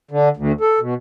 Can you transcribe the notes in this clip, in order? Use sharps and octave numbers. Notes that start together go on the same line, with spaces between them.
D3
D2
A4
B2